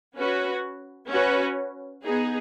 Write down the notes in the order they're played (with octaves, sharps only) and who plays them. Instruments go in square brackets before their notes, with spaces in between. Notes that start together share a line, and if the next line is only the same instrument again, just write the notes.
[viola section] C#4 F#4 B4
C#4 F#4 B4
B3 D#4 G#4